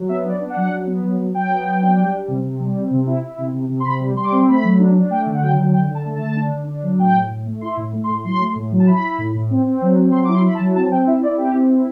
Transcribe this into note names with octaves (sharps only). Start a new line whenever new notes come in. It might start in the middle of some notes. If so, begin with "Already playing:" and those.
Already playing: F#3
B3 E5
D4 D5
D4
F#5
F#3
F#3
B3
F#3
F#3
F#3 G5
B3
F#3
D4
G3
G3
C3
C3
G3
C4
C3
E4
E4
C3
C3
C3
C6
C3 B5
G3
G3 C6
D6
C4 C6
A3 B5
F#3
D4
D4
A3 G5
D3
F#5
F#3 G5
D3
D3 G5
D3
A5
A3
D3 A5
D4
D3
D4
F#3
A2 G5
A2
A2
A3
E4 C6
A2
A3
C6
A2
F#3 C6
A3
A2
F#3
A5
E4 B5
E4
A2
A2
C4
C4
F#3
C4
F#3 C6
D6
E4 C6
E4 B5
A5
F#3
C4 A5
C4 G5
E4 E5
E4 D5
C4 G4
C4
E4